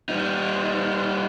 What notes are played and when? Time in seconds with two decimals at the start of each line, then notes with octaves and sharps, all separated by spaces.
0.09 G3 D#4